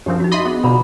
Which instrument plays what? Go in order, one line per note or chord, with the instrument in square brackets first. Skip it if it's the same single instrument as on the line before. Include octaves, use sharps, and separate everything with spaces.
[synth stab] F#2 F3 C4 [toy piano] D4 G4
[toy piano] D#4 F#4
[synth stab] D#5 B5 C6 [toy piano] E5 D6
[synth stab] B3 [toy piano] F#4 G#4
[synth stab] B2 D3 F3 [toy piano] A#5 B5